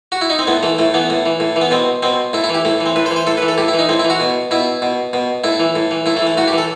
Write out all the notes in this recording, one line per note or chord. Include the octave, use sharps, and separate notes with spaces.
F#4
E4
D#4
C4
A2 B3
E3 A3
A2 A3
E3 B3
A2
E3
A2
E3
B3
B2 C4
B2 C4
A2 E4
E4
E3
G4
A2 A3
E3
C4
A2 B4
C5
E3
C5
A2 A4
B4
E3
A4
A2 G4
E4
E3
D#4
A2 C4
E4
E3
F#4
B2
B2 E4
B2
B2
A2 E4
E3
A2
E3
A2 E4
A3
E3
A3
A2 F#4
G4
E3 A4